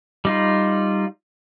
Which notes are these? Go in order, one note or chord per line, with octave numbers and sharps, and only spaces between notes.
G3 D#4 F4